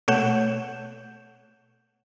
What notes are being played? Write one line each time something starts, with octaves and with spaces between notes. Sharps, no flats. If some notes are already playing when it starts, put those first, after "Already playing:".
B2 A3 C#5 F#5 G6 E7